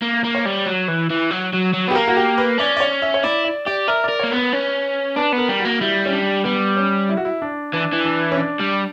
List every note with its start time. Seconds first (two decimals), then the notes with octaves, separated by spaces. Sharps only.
0.02 A#3
0.24 A#3
0.35 C#5
0.46 G3
0.66 F#3
0.88 E3
1.10 E3
1.30 F#3
1.53 F#3
1.73 F#3
1.88 B3
1.91 G4
1.95 A#3 A#4
2.08 F#4
2.17 G4
2.38 B4
2.59 C#4 D5
2.77 D5
2.80 C#5
3.02 E5
3.14 C#5
3.24 E4 D5
3.45 D5
3.66 G4 D5
3.88 A#4 E5
4.04 A#4 D5
4.20 A#3 C#5
4.31 B3
4.36 B4
4.53 C#4
5.16 D4 B4
5.32 B3
5.38 A#4
5.49 G3
5.60 F#4
5.65 A#3
5.80 G3 E4
6.06 C#4
6.13 D4
6.44 G3 B3
6.77 C#4
7.09 E4
7.17 F#4
7.25 E4
7.42 D4
7.73 E3 D4
7.92 E3
8.05 D4
8.32 C#4
8.37 D4
8.60 G3